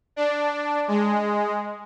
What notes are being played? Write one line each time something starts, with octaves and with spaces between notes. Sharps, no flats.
D4
G#3